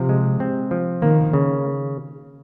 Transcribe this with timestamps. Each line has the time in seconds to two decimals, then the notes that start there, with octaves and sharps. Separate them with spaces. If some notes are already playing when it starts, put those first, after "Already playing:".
Already playing: C3 F3
0.09 G#3
0.40 C4
0.71 F3
1.02 D#3 A#3
1.33 C#3